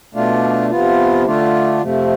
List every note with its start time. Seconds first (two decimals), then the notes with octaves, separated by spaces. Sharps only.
0.14 B2 A3 D4 F4
0.70 C3 F3 B3 F4
1.26 D3 A3 D4 F4
1.82 F2 C3 F3 A3